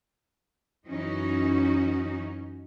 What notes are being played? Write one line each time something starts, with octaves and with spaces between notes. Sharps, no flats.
F#2 E3 C#4 D#4 F#4